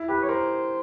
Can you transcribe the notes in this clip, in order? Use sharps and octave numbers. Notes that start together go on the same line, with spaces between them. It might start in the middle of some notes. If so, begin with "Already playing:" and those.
Already playing: E4
G4 B4
C#5
A#4 C5